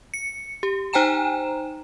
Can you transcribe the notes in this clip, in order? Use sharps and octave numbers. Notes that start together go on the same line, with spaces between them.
C#7
G4
D#4 C5 G5 G#5 A#5 E7